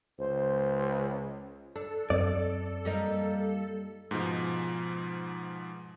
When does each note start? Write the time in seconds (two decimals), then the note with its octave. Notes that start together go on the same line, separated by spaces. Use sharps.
0.19 C#2 C5
1.76 D4 A4
2.10 F#2 C4 D5
2.85 G3 A#3 D#4
4.11 G#2 B2 F3 G#3